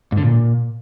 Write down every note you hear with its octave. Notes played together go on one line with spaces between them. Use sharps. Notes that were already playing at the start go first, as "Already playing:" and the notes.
G#2
D3
A#2